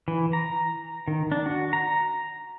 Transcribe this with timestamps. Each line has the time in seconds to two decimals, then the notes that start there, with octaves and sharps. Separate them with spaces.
0.08 E3
0.33 A#5
1.08 D#3
1.32 D4
1.46 F#4
1.73 A#5